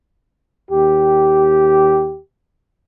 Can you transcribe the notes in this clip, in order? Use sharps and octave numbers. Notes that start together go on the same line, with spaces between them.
D#2 G4